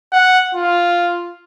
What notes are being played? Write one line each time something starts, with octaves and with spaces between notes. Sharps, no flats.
F#5
F4